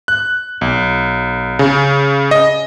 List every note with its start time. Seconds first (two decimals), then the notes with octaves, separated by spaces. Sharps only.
0.08 F#6
0.61 B1
1.59 C#3
2.31 D#5